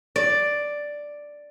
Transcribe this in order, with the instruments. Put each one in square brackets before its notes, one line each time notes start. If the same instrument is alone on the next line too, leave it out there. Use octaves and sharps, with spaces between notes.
[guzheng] D5